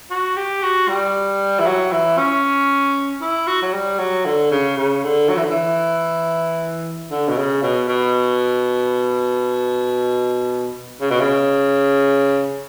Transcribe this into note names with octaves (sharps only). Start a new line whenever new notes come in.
F#4
G4
F#4
G3
E3
F#3
E3
C#4
E4
F#4
F#3
G3
F#3
D3
C#3
C#3
D3
F#3
E3
D3
E3
D3
B2
C#3
B2
B2
C#3
B2
C#3